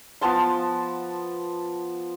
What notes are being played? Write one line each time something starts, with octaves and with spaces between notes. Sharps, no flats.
F3 B3 A5 C6